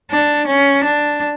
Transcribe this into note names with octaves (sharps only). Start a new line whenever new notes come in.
D4
C#4
D4